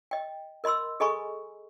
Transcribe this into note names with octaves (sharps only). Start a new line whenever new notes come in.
D#5 G5
A#4 D#5 B5 C6 E6
G#4 A4 D#5 G#5 B5 C#6